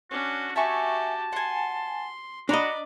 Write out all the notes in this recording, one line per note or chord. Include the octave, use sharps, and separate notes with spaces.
C#4 D4 F#4
F#4 G4 E5 G#5 A5 C#6
F#5 G#5 C6
D4 F#4 D5 D#5 A#5 B5 F#6